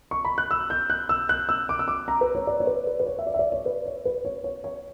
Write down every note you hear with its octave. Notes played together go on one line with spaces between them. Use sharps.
C#6
B5
F#6
E6
G6
F#6
E6
F#6
E6
D6
E6
D6
A#5
B4
C#5
D5
C#5
B4
B4
B4
C#5
E5
D5
E5
D5
C#5
B4
C#5
B4
C#5
C#5
C#5